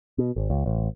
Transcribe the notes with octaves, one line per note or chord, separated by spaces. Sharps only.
B2
G#1
C#2
A1